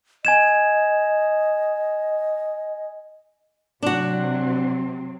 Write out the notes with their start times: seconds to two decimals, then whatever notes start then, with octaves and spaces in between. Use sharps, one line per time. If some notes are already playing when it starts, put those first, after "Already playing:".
0.25 D#5 G#5 G#6 E7
3.83 C3 F#3 C4 D4 F#4